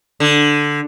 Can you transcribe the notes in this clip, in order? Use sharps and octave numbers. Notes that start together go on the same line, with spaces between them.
D3